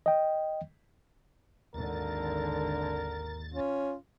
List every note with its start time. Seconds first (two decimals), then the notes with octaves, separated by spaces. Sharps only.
0.06 D#5 G5
1.74 G#1 D#2 D3 A#4 A6
3.54 C#4 F4